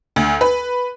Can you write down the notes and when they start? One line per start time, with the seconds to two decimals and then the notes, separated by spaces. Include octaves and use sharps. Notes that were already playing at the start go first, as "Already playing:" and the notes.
0.16 D2
0.41 B4